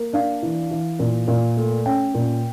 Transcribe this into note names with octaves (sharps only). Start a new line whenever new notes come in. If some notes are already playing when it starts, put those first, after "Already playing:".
Already playing: A#3
D4 F5
E3
E3
A#2
A#2
A3
C#4 G5
A#2